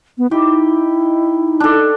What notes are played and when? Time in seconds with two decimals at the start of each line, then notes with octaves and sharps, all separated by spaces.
0.18 B3
0.31 D#4 E4 G4
1.60 D4 A4